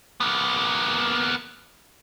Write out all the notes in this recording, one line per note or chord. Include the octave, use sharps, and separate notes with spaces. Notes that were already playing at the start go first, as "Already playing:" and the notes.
A#3 B3